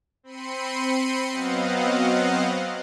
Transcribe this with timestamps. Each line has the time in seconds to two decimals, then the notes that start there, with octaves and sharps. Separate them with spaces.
0.23 C4 B5 C6 C#7 D#7
1.29 F#3 B3 C4 D#5 F5 F#5